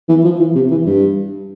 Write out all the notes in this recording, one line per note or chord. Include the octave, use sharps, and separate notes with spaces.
E3
F3
E3
C3
E3
G2